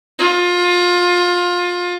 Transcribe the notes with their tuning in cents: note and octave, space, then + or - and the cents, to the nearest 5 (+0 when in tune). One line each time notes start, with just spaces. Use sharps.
F4 +25